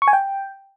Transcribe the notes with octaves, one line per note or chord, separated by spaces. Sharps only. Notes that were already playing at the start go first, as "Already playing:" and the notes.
C#6
G#5
G5